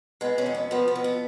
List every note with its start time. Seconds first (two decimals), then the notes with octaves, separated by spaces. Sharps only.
0.21 G#3 B3
0.38 C#4
0.46 F2
0.54 B3
0.71 F3 B3
0.88 B3
0.95 F2
1.04 B3